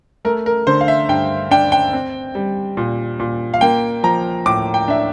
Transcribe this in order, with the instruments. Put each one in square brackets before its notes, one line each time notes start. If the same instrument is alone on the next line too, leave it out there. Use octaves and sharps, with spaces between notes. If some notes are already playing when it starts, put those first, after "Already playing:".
[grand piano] A3 A#4
A#4
D3 C5
F5
E5
G2 G5
D4 G5
G5
C4
G3
A#2
A#2
F5
A#3 G5
F3 A#5
A2 D6
G5
D4 E5